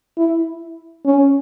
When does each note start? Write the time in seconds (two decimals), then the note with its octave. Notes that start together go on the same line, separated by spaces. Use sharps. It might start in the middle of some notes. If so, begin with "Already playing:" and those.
0.18 E4
1.06 C#4